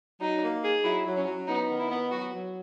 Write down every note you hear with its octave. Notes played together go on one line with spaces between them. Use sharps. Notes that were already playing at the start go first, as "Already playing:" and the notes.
F#3 D#4
A#3
G#4
F#3 E4
F#3
C#4
F#3
B3 D#4
D#3
E4
B3
F#3 F#4
F#3